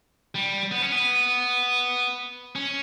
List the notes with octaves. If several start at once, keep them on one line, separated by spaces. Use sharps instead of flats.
G3
B3
C#4
B3
C#4